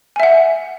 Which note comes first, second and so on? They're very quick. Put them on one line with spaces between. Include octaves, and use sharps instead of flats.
G#5 E5 F#5